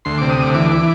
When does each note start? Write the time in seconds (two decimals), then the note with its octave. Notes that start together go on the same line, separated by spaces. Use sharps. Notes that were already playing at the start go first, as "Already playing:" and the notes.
0.05 D2 C6
0.18 C3 D6
0.30 D#6
0.38 D2 D6
0.54 E3 D6
0.71 E3